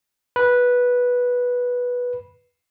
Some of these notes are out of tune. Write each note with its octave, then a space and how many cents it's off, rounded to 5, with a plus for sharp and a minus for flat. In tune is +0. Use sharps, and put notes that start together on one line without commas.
B4 -10